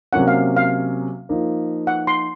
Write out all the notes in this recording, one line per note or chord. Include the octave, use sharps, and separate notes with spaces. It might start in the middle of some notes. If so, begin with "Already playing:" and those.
C3 F#3 A#3 C#4 F#5
F5
F5
F3 A#3 D#4
F#5
C6